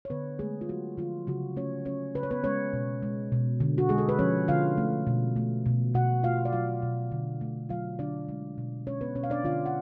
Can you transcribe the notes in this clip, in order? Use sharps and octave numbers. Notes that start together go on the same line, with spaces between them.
C#5
D3 B3 B4
G#3 A3 G#4
F4
F#3 F#4
D3 F3 F4
C#3 F#3 F#4
A3 C#4 C#5
F#3 C#4 C#5
C#3 B4
C#5
B3 B4
G#3 C#4 C#5
B2
G#3
B2
D3
F#4
G#3 G#4
A4
B4
F3 C#4 C#5
D3 F4 F5
A3
B2
A3
B2
B2 F#4 F#5
A3 F4 F5
D5
F#3 F4 F5
B2
D3
A3
F#3 F4 F5
D3 D4 D5
G#3
B2
G#3 C#4 C#5
B3 B4
B2 C#4 C#5
F5
D4 D5
D3 F4 F5
F#5